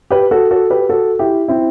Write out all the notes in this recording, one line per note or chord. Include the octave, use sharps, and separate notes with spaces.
G4 B4
F#4 A4
F#4 A4
G4 B4
F#4 A4
E4 G4
C4 E4